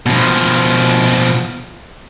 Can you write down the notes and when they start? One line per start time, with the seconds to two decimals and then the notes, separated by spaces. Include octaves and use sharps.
0.06 B2 F3